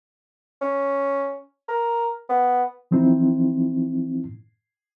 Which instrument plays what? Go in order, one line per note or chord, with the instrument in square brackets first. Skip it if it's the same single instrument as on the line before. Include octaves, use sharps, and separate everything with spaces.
[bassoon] C#4
A#4
B3
[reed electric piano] E3 F3 C4 D#4 E4